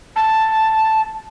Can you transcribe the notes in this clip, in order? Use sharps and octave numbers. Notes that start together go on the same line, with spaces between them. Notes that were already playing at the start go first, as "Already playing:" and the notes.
A5